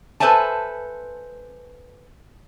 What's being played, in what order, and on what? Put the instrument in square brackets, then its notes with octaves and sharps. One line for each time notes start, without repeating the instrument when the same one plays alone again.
[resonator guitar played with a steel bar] A4 B4 C5 E5 G#5 A5